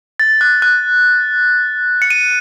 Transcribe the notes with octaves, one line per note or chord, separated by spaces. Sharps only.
A6
F#6
F#6
C#7
D#7